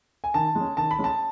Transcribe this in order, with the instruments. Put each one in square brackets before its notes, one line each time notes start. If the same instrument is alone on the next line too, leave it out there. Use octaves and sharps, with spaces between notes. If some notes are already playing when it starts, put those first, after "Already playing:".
[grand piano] G#5
D#3 A5
G#3 C#4
D#3 A5
B5
G#3 C#4
A5